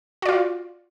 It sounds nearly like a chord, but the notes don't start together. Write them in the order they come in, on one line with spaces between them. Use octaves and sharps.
F#4 D5 F4